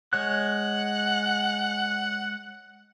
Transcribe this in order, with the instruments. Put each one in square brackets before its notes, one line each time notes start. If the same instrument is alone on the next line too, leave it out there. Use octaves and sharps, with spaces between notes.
[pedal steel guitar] G#3 C#5 F#6 [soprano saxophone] F#5